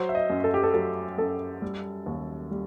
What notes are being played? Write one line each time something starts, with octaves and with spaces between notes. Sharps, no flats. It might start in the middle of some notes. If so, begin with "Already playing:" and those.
Already playing: F#3 C5
E5
D#5
F#2
A4
G4
A4
F#3 A4
F#2 A4
G3
D#2
G3